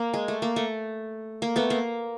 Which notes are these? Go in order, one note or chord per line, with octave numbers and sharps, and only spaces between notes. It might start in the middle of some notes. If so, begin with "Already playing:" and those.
Already playing: A#3
G#3
A3
A#3
A3
A#3
A3 B3
A#3